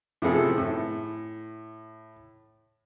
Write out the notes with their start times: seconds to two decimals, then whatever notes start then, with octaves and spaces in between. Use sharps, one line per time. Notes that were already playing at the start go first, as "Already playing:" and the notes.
0.22 A2 C3 F3 B3 G#4 A4
0.58 A2